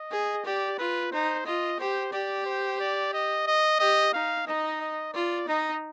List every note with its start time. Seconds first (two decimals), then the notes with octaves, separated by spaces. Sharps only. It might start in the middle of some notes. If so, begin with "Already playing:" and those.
Already playing: D#5
0.11 G#4
0.45 G4 D5
0.79 F4 B4
1.12 D#4 C5
1.46 F4 D#5
1.79 G4 C5
2.13 G4 D5
2.46 C5
2.80 D5
3.14 D#5
3.47 D#5
3.80 G4 D#5
4.14 D#4 F5
4.47 D#4 D#5
4.81 D#5
5.14 F4 D5
5.48 D#4 D#5